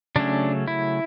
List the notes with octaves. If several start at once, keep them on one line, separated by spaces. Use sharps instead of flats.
C#3 F#3 A3 C#4 D4
E4